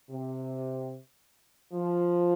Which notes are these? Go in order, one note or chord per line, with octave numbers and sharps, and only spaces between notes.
C3
F3